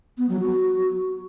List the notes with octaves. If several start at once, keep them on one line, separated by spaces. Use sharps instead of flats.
B3
F#3
F#4